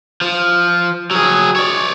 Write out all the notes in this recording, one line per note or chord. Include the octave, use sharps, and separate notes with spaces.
F3
F#3 G#4
C#5 D5